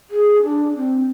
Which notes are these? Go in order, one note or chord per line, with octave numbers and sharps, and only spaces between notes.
G#4
D4
C4